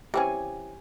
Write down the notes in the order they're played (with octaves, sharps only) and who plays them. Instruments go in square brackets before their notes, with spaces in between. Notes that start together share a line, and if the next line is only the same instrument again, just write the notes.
[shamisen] E3 C4 C#4 [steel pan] G4 G#5